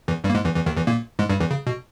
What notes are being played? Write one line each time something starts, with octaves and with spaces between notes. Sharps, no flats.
E2 E3
G2 G3
A#3
G#2 G#3
E2 E3
E2 E3
D#2 D#3
E2 E3
A#2 A#3
G#2 G#3
G2 G3
E2 E3
C#3
B2